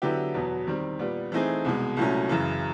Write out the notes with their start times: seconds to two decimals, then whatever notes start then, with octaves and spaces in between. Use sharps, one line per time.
0.02 D3 F#3 B3 E4 G4
0.34 E2 B2 F#3 B3
0.67 D#3 G3 C4
0.99 A#2 G3 B3
1.32 E3 A3 C4 D#4 G#4
1.65 C2 B2 G#3
1.97 C2 A#2 F#3 A3 C#4
2.29 F#2 C#3 E3